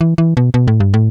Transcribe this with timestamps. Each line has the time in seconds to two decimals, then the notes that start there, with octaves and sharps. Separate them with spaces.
0.01 E3
0.18 E3
0.37 B2
0.54 B2
0.68 A2
0.80 G2
0.94 A2